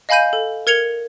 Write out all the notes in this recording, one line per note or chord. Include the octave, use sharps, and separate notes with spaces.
D#5 F5 G#5 B5 G6 D#7
A4
A#4 G#6 C#7 F7 G7